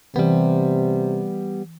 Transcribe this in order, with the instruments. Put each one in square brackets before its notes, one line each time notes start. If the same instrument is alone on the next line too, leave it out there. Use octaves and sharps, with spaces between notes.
[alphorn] C3 [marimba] E3 [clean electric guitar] G3 B3